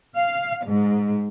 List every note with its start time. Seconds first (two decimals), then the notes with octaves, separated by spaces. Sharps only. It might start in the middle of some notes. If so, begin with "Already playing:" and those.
0.16 F5
0.65 G#2